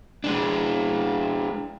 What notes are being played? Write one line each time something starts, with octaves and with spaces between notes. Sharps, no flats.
G#3 D4